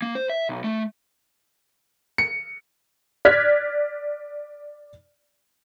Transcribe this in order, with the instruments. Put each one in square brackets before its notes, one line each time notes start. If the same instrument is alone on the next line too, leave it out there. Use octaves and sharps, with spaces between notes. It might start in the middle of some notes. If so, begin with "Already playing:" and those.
[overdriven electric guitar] A#3
C5
E5
B1
A3
[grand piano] C#7
[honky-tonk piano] D5 F6 F#6 G#6 B6